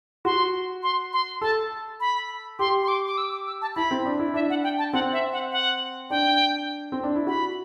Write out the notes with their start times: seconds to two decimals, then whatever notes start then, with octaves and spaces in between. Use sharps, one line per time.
0.25 F#4 C6
0.83 C6
1.13 C6
1.41 A4 A5
2.00 B5
2.59 G4 C6
2.83 C6
2.88 D6
3.07 D6
3.18 E6
3.32 D6
3.47 E6
3.62 A5
3.76 E4 B5
3.91 C4
4.06 D4
4.19 E4
4.34 D4 E5
4.50 F#5
4.64 G5
4.78 A5
4.93 C4 F#5
5.12 E5
5.32 F#5
5.52 F#5
6.10 D4 G5
6.92 C4
7.04 D4
7.16 E4
7.27 F#4 B5